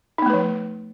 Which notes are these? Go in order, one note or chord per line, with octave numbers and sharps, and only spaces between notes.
F3 A3 B3 D#4 B4